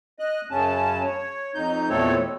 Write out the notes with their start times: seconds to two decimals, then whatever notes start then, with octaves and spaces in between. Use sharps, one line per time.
0.19 D#5 F#6
0.51 F#2 C#3 C#4 A5
1.03 C#5
1.55 F2 D#4 G6
1.89 E2 A#2 A3 C4 A4 C#5
2.19 B2